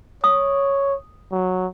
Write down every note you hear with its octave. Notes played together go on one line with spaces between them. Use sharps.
C#5 D#6
F#3